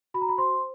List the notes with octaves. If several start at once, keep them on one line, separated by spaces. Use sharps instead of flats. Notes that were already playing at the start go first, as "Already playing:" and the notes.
F#4 B5
A#5
B5
C5 C6